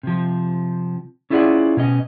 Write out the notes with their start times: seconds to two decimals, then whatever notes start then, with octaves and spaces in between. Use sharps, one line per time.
0.03 C3 F3
1.30 C#4 E4 F4 G#4 D5 F#5
1.77 B2 C#4 D#5